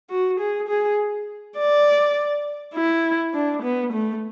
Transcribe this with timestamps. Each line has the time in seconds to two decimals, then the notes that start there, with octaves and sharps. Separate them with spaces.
0.10 F#4
0.40 G#4
0.68 G#4
1.58 D5
2.74 E4
3.34 D4
3.62 B3
3.93 A3